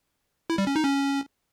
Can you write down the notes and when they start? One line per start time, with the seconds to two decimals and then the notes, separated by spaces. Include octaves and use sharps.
0.50 E4
0.58 G3
0.67 C#4
0.76 D#4
0.84 C#4